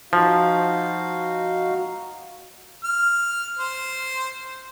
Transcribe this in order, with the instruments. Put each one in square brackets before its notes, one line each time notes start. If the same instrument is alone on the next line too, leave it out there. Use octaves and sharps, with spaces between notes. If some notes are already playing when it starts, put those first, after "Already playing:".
[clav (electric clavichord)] F3 [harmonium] D#4 F#4 F5
[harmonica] F6
C5